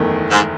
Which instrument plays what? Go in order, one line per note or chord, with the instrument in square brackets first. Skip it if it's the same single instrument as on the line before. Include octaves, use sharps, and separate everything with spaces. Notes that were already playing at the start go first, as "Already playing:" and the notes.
Already playing: [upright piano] F#1 E2 D#3 A3
[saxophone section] G#2